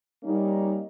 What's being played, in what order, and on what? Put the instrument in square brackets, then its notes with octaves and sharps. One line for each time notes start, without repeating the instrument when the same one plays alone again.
[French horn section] G3 A#3 C#4 D#4